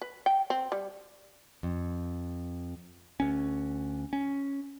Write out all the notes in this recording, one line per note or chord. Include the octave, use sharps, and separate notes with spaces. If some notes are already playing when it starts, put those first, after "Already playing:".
B4
G5
C4
G3
F2
D2 C#4
C#4